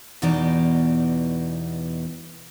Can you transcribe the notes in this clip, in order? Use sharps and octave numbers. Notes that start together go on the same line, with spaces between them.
E2 B2 E3 G3 D#4 D5